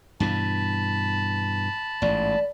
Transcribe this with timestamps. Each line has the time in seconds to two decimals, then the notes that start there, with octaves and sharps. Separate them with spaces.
0.20 G2 B2 E3 A5 B5
2.02 A1 G#2 D5